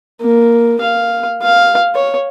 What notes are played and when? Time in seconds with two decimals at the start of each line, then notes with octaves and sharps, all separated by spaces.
0.22 A#3
0.81 F5
1.43 F5
1.95 C#5